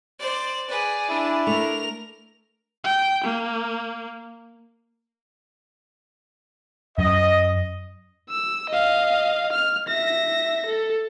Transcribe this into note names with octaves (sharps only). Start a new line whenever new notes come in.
C5 D5
G#4 B4 D5
D4 E4
A3 A#4 F7
G5
A#3
F#2 D#5
E6
D#5 F5
F6
E5 A#6
A4